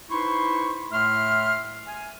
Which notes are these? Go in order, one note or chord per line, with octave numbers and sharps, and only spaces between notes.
D#4 E4 B4 C5 C6 C#6
A2 A3 E5 C6 F6
G#5